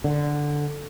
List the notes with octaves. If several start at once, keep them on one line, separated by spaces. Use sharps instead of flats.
D3